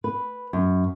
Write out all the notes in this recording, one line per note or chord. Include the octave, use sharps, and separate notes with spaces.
B4
F#2